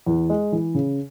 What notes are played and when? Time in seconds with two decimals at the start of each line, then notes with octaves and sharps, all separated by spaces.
0.06 E2
0.30 G#3
0.52 E3
0.75 C#3